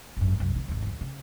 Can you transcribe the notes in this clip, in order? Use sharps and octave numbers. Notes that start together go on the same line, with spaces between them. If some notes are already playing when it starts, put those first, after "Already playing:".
G#1 F#2
C2 F#2
D#3 C4
G#1 D#2
D2 G2
C#3